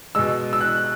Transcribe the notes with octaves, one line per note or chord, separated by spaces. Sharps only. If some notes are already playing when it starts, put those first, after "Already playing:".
B2 G#3 E6
E6
F#6